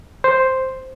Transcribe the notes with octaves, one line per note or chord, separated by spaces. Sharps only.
C5